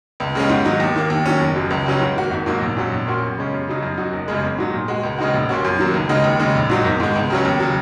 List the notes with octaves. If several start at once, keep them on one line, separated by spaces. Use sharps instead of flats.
C#2
C#3 G#3 C#4
G#2
D#3 F#3 D#4
D#2
D#3 A#3
D#2
D#3 F#3 C#4
F#1
F#2 F#3
C#2
C#3 F#3 C#4
G#2
D#3 A#3 F#4
G#1
G#2 F#3 A#3 D#4
A#1
G#2 F#3 C#4
A#1
A#2 A#3 C#4 F#4
F#2
C#3 G#3 C#4
F#2
C#3 F#3 D#4
F#2
F#3 D#4 F#4
F#1
F#2 C#3 G#3
G#1
G#2 F#3 D#4
A#2
G#3 F#4
C#2
C#3 G#3 D#4 F#4
A#1
A#2 A#3 C#4 F#4
F#2
D#3 F#3 A#3
C#2
C#3 G#3 D#4 F#4
D#2
C#3 G#3 D#4
A#1
G#2 F#3 D#4
G#1
G#2 G#3
C#2
C#3 F#3 C#4
D#2
C#3 F#3